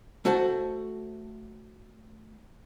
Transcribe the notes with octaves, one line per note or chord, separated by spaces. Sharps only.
A3 F#4 C5 F#5 A5